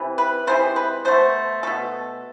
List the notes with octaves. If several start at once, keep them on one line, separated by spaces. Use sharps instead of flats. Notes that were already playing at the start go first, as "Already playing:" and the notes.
Already playing: C3 E3
B4
C3 E3 G#3 C5
B4
B2 A3 C5
B2 A3 A4